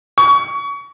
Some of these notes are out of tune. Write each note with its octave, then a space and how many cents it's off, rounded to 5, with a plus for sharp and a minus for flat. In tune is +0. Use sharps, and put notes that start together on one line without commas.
C#6 +30